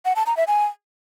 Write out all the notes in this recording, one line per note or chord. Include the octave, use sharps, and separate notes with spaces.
F#5
A5
A#5
E5
G#5